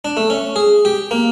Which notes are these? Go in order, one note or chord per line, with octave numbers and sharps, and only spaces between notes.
D4
A3
C#4
G#4
G4
A#3